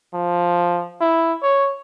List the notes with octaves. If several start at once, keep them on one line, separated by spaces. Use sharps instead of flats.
F3
E4
C#5